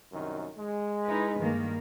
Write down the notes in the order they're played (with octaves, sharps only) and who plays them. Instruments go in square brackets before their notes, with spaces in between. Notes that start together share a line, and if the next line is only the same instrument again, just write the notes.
[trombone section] C2 F#2 D#3
G#3
[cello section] D#4 E4 B4
G2 D#3 A#3